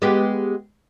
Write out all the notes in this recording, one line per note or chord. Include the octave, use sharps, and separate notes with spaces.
G#3 B3 G4